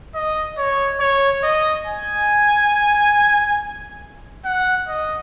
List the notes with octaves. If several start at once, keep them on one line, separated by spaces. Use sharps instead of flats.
D#5
C#5
C#5
D#5
G#5
F#5
D#5